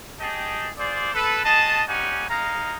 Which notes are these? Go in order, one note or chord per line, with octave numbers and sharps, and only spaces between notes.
G4 G#4 D#5 G5 A5
F4 G#4 C5 D5
A4 B4
F#4 G#4 D#5 A5
G3 C#4 D#4 G4 F#5 G#5
G#3 D#4 F5 A#5